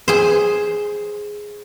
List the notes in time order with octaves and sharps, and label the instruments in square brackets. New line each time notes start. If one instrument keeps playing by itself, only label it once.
[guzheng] G#4 C5